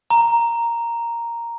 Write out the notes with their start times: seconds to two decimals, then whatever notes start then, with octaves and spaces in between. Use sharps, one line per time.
0.10 A#5